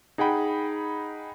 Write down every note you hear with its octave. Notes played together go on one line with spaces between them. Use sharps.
D#4 G#4 F#5 G5 B5